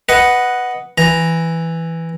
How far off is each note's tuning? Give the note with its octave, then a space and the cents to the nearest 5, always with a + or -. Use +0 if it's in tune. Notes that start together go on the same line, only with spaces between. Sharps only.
B4 +0 D#5 +0 F#5 +0
E3 +0 A#5 +0